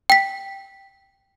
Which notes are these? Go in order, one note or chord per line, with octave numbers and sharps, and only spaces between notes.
G5 B6